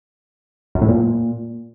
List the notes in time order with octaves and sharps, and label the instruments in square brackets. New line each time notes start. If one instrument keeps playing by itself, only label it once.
[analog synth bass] F#2
A2
A#2